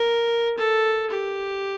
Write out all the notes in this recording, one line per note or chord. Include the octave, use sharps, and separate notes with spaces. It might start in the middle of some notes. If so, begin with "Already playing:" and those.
Already playing: A#4
A4
G4